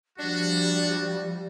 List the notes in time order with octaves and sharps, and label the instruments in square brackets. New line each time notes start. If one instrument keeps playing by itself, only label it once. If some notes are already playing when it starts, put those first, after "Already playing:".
[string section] F3 G3 [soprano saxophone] D4 [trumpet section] F#4 [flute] D5